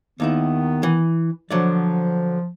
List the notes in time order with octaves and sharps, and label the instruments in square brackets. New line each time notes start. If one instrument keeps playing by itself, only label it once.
[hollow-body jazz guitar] D#2 D#4 E4 [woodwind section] D#3 B3
[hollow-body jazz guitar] E3
[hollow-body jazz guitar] D3 F#3 D5 [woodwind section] F3